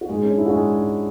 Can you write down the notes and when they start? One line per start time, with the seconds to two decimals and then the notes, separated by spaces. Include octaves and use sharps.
0.01 F#4
0.09 G#2 G#3 G#4
0.23 C#4
0.30 G#2 D4
0.38 E4
0.46 F#4
0.54 G#2 G#3 G#4
0.77 G#2